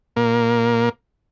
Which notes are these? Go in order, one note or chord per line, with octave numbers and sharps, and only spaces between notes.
A#2 A#3